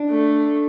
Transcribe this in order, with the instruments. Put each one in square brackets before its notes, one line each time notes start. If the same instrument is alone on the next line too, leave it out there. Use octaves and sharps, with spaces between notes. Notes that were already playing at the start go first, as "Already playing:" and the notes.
Already playing: [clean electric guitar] D4
[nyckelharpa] A3